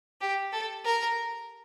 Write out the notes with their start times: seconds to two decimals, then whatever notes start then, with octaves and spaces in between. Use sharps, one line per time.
0.21 G4
0.52 A4
0.85 A#4